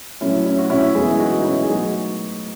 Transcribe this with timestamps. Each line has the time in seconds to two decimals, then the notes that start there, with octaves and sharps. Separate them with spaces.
0.21 A2 F#3 A3 C#4 E4
0.46 C#4 E4
0.59 F#4
0.70 C#4 E4
0.94 F#2 E3 G#3 B3 E4 G#4
1.19 D#4 F#4
1.39 D#4
1.45 C#4 E4
1.63 G#4
1.69 A2 F#3 B3 D#4 F#4